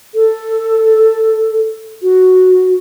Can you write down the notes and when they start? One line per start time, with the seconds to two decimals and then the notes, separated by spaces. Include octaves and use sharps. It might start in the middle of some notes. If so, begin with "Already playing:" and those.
0.15 A4
2.02 F#4